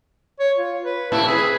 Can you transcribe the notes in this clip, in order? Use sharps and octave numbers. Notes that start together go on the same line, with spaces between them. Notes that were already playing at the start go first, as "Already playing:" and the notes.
C#5
F4
B4
A2 C3 E4 A5
C4 G#4 B4 B5